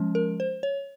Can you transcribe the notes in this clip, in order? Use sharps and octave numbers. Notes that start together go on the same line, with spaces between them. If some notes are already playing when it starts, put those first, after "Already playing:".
Already playing: F3 G#3 C#4
A#4
C5
C#5